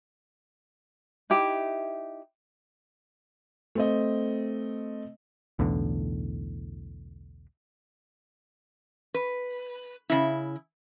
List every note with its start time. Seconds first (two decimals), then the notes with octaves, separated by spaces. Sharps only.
1.30 D#4 E4 G4 E5
3.75 A3 C4 D#5
5.59 B1 E2 A2 D3
9.14 B4
10.10 C#3 E4